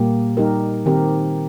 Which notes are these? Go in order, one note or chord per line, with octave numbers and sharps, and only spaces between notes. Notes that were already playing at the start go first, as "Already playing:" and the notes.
Already playing: A#2 G3 A#3 G4
G3 D#4 G4 A#4
D#3 C4 G4 A#4